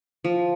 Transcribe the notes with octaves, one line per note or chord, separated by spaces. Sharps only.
F3